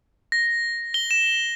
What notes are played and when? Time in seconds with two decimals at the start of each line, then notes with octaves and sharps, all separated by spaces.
0.32 A#6
0.94 G7
1.11 E7